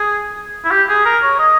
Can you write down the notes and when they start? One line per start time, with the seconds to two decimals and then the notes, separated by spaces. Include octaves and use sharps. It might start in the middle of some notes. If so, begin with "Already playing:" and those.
Already playing: G#4
0.65 E4
0.71 G4
0.89 G#4
1.05 A#4
1.23 C#5
1.39 D#5